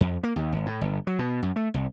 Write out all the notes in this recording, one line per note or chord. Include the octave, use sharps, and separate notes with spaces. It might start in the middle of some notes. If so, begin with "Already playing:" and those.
F2
A#3
D#2
G#1
A2
G1
F#3
B2
F#2
A3
C2